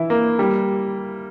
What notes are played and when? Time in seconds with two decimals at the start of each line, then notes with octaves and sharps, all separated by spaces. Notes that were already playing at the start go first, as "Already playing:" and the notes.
Already playing: E3 E4
0.10 A#3
0.39 G3